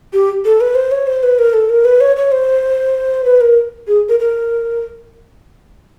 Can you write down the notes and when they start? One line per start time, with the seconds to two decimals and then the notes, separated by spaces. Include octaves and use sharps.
0.13 G4
0.45 A4
0.61 B4
0.75 C5
0.91 C#5
1.07 C5
1.23 B4
1.39 A#4
1.53 A4
1.69 A#4
1.85 B4
2.01 C#5
2.17 C#5
2.32 C5
3.25 B4
3.41 A#4
3.87 G#4
4.09 A#4
4.20 A#4